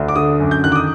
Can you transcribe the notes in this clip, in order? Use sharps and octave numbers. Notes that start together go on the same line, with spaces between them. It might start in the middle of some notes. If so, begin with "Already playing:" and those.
Already playing: D2
D6
D3 D#6
F#2
G6
D#3 F#6
D6
D#6